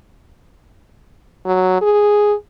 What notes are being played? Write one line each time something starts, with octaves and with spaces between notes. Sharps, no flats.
F#3
G#4